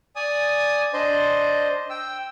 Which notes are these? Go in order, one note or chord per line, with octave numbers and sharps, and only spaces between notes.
D5 G#5 D#6
D4 C5 D#5
G5 E6